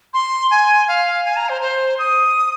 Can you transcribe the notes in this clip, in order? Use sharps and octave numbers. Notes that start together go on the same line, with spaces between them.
C6
G#5
F5
G#5
A#5
C5
C5
D#6